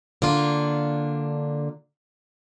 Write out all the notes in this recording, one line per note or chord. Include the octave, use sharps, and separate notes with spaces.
D3 A#3 D4 F4